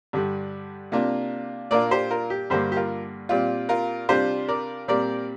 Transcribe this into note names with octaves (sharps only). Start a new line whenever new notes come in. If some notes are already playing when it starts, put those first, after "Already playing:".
G2 D3 G3
C3 A#3 D4 F4
A#2 A#3 D4 F4 A#4 D5
G4 C5
F4 A#4
G4
G2 D3 A#3 G4 C5
G4
F4 A#4
A#2 G3 C4 F4
F4 A#4
C3 G3 D4 F4 G4 C5
A#4 D5
A#2 G3 C4 A#4 D5